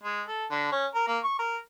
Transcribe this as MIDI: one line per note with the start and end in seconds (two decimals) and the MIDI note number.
0.03 0.22 56
0.27 0.45 69
0.51 0.71 50
0.72 0.86 61
0.95 1.04 70
1.07 1.18 58
1.24 1.35 85
1.39 1.57 70